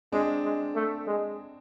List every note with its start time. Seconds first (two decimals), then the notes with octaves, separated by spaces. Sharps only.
0.12 G#3 C4 D4
0.43 G#3
0.75 A3
1.07 G#3